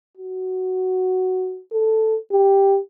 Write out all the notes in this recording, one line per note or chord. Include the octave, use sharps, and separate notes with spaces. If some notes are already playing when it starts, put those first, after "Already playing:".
F#4
A4
G4